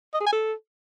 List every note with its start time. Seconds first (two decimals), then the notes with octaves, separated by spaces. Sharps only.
0.14 D#5
0.20 G#4
0.27 G#5
0.33 A4